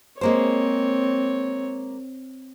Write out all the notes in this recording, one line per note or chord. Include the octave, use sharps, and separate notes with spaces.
G#3 A#3 C4 C5 C#5